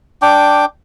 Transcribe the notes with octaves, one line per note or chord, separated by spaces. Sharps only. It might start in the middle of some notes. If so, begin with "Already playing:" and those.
D4 G5 D6